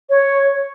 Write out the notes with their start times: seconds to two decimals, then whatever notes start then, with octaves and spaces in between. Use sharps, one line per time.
0.10 C#5